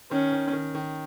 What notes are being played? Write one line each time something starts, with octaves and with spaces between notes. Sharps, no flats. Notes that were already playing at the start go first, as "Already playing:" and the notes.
D#3 C#4
D#3
D#3
D#3